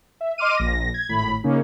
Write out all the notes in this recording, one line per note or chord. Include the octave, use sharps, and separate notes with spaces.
E5
D#5 C6 D6 F6 D#7
A#1 A#6
G#6
G#1 A2 B5
C#3 A#3 C#4 D#4